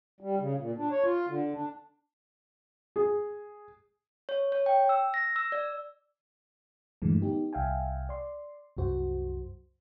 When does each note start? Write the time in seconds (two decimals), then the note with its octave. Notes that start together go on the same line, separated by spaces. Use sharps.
0.21 G3
0.40 C#3
0.58 A#2
0.78 D4
0.91 C#5
1.04 F4
1.28 D3
1.53 D4
2.96 G#4
4.29 C#5
4.52 C#5
4.66 G5
4.89 E6
5.14 A#6
5.36 E6
5.52 D5
7.02 G2 A#2 D3 E3 G#3 A3
7.22 B3 D#4 G4
7.53 C2 E5 F5 G5 G#5
8.09 D5 C6
8.77 C2 F#2 F#4 C5